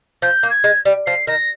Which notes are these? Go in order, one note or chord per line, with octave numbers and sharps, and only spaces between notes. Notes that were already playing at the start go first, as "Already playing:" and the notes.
F3 G6
A#3
G#6
G#3
G3
F3 C7
D#3 A#6